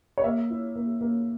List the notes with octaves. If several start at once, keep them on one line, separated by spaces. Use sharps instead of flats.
C#5
A#3 E5
E4
A#3
A#3